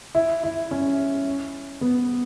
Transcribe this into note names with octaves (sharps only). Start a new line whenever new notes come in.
E4
E4
C#4
B3